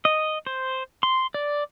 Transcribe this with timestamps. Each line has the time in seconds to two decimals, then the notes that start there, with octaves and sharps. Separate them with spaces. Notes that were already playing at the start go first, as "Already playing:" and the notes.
0.05 D#5
0.47 C5
1.03 C6
1.34 D5